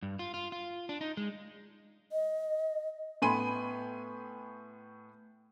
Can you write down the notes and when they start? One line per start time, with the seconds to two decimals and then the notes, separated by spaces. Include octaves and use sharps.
0.03 G2
0.19 F4
0.34 F4
0.52 F4
0.89 D4
1.01 D#4
1.17 G#3
2.12 D#5
3.22 A2 B3 G#5 B5 C6 D#7